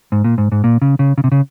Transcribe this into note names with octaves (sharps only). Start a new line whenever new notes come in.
G#2
A#2
G#2
G#2
A#2
C#3
C#3
C#3
C3
C#3